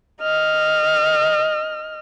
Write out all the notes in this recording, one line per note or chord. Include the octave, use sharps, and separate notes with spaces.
D#5 F6